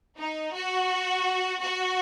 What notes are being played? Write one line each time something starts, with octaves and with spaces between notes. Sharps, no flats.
D#4
F#4
F#4